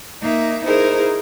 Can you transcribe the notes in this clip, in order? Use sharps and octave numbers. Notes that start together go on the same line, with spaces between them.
A#3 D#4 E5
D#4 E4 G#4 A#4 C5